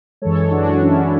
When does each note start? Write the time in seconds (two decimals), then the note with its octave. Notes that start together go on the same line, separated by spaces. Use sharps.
0.22 F#2 E3 G#3 A4 C#5
0.51 D4 F#4
0.81 C#4 E4